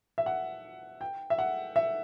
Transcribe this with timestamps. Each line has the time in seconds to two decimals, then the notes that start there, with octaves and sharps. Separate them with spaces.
0.18 E5
0.26 F#5
1.01 G5
1.30 E5
1.39 F#5
1.76 E5